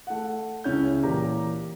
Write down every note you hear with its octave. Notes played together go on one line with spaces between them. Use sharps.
A3 F#5
C#2 C#3 C#4 E4 G6
A#2 E3 G4 A#5